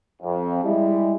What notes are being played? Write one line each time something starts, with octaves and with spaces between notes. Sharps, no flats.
F2
G3 G#3 E4